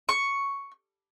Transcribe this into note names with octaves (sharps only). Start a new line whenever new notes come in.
C#6